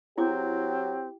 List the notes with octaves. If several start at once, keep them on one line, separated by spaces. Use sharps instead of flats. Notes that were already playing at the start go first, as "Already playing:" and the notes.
F#3 C4 E4 G4 G#4 D6